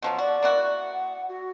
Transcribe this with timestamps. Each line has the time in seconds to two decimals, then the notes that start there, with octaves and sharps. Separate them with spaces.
0.02 B2 F3 F#3
0.18 F#4 D5
0.42 A#3 E4 F#4
0.79 F#5
1.29 F#4